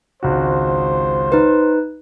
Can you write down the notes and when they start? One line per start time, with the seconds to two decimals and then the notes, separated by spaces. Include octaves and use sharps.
0.23 G#1 C#2 F#4 C5
1.32 D#4 B4